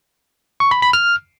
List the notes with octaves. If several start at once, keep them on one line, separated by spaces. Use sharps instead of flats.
C#6
B5
B5
F6